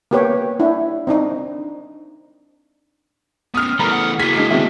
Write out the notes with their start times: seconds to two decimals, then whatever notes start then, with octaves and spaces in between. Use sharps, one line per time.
0.11 A#3 B3 G4 B4 C#5
0.60 D4 E4
1.07 C4 D4 D#4
3.54 B3 C#4 D#6 F6
3.79 E3 G3 A3 B3 A#4 A#5 B5
3.92 F#5
4.19 A#3 E4 F#4 G#4 G#6 B6
4.36 G#3 D4 C7
4.51 D3 D#3 B3 C4 F#4 E5